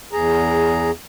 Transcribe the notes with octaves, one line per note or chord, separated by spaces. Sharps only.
E2 G#4 A#5